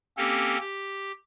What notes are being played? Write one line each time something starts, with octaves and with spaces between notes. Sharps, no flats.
A#3 C4 C#4 G4 A4
G4